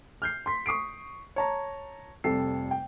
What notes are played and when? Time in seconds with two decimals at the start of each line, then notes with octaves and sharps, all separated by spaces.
0.22 F6 G6 C7
0.46 C6 B6
0.66 C#6 D#6 C7 D7
1.36 C#5 A5 A#5
2.24 F1 F2 G3 A4 C7
2.71 G5